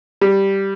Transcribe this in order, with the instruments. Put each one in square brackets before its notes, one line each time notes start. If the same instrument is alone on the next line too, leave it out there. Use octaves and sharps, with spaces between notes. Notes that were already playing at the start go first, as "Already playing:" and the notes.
[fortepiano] G3